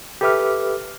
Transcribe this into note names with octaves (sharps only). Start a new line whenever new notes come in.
G4 A4 B4 E5 D6 F6